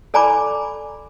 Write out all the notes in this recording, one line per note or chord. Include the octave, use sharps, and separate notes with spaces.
A4 D5 G#5 A#5 B5 D6